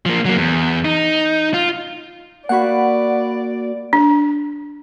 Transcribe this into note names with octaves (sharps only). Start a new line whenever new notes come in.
F3 A#3
F#3 A#3
E2
D#4
F4
A#3 F#4 D5 F#5 B5
D4